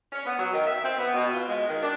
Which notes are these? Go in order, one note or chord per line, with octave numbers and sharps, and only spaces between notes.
C#4
B3
F#3
D#3
E5
C4
B3
B2
F4
G#3
D#3
D4